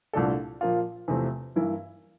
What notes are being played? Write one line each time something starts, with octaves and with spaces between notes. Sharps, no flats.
C2 A#2 A3 D4 A4
A#2 F3 A#3 F4
E2 C3 F3 A3 C4
G2 E3 A#3 E4